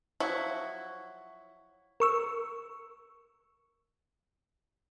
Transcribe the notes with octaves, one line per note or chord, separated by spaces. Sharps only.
F3 F#3 E4 F#4
A#4 C#6 E6